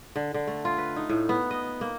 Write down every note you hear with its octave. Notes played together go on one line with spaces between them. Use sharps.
D3
D3
A3
F4
B4
D#4
A2
B3
D#5
A#3